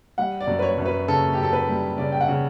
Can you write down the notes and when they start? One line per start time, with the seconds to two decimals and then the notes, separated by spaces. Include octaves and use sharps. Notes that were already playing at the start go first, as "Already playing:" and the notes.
0.18 G3 F#5
0.40 D5
0.47 F#2
0.59 B4
0.62 C#5
0.78 F#2
0.86 B4
1.08 C#3 A4
1.33 G4
1.38 F#2 A4
1.53 B4
1.68 G3
1.98 C#3 D5
2.12 G5
2.21 F#5
2.28 C#3